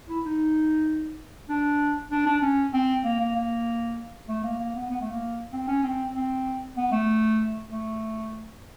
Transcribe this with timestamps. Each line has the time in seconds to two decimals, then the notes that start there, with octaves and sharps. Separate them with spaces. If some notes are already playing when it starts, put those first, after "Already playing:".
0.09 E4
0.25 D#4
1.49 D4
2.11 D4
2.26 D4
2.42 C#4
2.73 C4
3.04 A#3
3.20 A#3
3.35 A#3
4.28 A3
4.44 A#3
4.59 A#3
4.75 B3
4.90 B3
5.01 A3
5.11 A#3
5.53 C4
5.68 C#4
5.83 C4
6.15 C4
6.77 B3
6.92 A3
7.70 A3